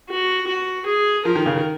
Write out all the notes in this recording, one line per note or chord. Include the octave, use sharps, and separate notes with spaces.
F#4
F#4
G#4
F3 A#4
D#3
C#3
D#3